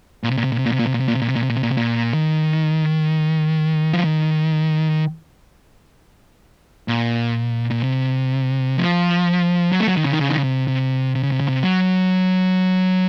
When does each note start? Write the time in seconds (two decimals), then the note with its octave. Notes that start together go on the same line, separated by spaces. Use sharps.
0.23 A#2
0.31 C3
0.37 A#2
0.44 C3
0.52 A#2
0.59 C3
0.66 A#2
0.72 C3
0.79 A#2
0.87 C3
0.94 A#2
1.00 C3
1.08 A#2
1.15 C3
1.22 A#2
1.28 C3
1.36 A#2
1.43 C3
1.50 A#2
1.57 C3
1.63 A#2
1.71 C3
1.77 A#2
2.14 D#3
3.94 F3
4.04 D#3
6.88 A#2
7.71 A#2
7.83 C3
8.77 F3
9.72 F#3
9.80 A3
9.87 F#3
9.97 D#3
10.04 C#3
10.11 D#3
10.19 C#3
10.29 D#3
10.37 C#3
10.43 C3
10.67 C3
11.15 C3
11.23 C#3
11.32 C3
11.40 C#3
11.48 C3
11.63 F#3